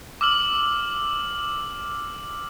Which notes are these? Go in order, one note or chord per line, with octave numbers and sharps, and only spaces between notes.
D6 E6 F6 F#7